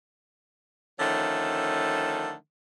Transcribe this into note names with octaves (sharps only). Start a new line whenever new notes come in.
D3 D#3 F3 A3 C#4